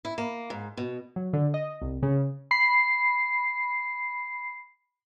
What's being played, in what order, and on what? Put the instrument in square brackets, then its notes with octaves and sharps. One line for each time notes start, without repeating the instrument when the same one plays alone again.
[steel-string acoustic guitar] E4
A#3
G#2
B2
[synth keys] F#3
D3
D#5
C2
C#3
[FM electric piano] B5 C7